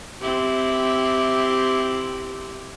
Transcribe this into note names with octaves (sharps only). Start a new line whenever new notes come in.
C4 E4 G4